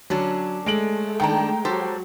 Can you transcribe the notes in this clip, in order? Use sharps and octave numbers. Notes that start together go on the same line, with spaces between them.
D3 F#3 C#4 D4
G#3 A3 D7 F#7
G2 D#3 D4 G5 A#5
F#3 G4 A4 C5